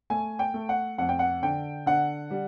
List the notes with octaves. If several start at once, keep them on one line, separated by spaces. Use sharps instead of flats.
A3 G#5
G5
A3
F#5
F2 F#5
G5
F#5
D3 G5
D3 F#5
G3